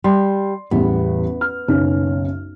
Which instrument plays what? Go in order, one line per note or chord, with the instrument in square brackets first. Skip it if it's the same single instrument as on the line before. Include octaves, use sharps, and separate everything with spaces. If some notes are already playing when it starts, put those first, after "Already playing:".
[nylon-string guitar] G3 [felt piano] C6
[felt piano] A1 E2 G3 [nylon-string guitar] B3
[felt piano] F6
F#1 B1 C#4